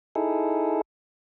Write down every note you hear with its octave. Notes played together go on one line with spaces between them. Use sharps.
D#4 E4 G#4 A4